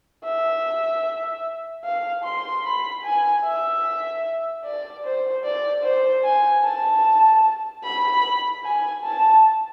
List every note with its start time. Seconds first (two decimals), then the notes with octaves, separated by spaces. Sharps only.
0.24 E5
1.84 F5
2.24 C6
2.64 B5
3.03 G#5
3.45 E5
4.65 D5
5.05 C5
5.45 D5
5.84 C5
6.24 G#5
6.64 A5
7.84 B5
8.64 G#5
9.04 A5